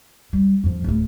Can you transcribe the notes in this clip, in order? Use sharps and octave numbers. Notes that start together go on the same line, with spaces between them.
G3
F2 F3
D1 A3